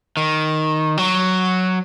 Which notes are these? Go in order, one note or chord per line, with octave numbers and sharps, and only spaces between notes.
D#3
F#3